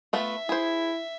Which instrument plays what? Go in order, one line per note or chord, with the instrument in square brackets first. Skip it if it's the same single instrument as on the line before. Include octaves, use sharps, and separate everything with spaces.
[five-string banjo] A3 B3 F4 [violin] E5
[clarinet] E4 [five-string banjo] G#4 C5